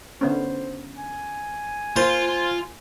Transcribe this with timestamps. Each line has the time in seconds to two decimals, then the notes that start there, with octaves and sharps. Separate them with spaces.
0.21 D3 B3 C#4 C5
0.97 G#5
1.96 A#3 F4 C5 C6